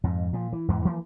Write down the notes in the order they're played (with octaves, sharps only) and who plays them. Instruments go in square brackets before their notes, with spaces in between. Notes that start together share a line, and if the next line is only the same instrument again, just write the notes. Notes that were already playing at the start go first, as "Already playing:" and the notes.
[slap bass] F2 G#2
A#2 F3
E3
E2 G#2 E3
E3 F3 A3 A#3